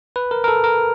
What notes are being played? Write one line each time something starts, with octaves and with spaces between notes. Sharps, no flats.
B4
A#4
A#4
A4
A#4